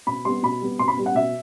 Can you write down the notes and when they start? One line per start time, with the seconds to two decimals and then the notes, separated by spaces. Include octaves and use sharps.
0.07 B2 B5
0.25 G3 B3 C6
0.43 B2 B5
0.61 G3 B3
0.79 B2 C6
0.88 B5
0.97 G3 B3
1.06 F#5
1.15 B2 E5